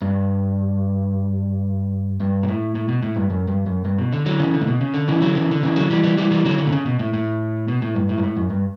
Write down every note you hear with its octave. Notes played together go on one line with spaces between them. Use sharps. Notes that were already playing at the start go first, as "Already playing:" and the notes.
G2
G2
B2
A2
A2
B2
A2
G2
F#2
G2
F#2
G2
B2
D3
D3 F#3
C#3 E3
D3
A2
B2
C#3
D3
C#3 E3
D3 F#3
C#3 E3
D3
C#3 E3
D3 F#3
E3 G3
E3 G3
E3 G3
E3 G3
D3 F#3
D3
B2
C#3
B2
A2
A2
B2
A2
G2
A2
G2
A2
F#2
G2